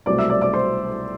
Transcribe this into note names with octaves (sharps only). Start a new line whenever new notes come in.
C2 B2 F#3 A3 C4 D5 D6
E5 E6
D5 D6
D5 D6
C5 C6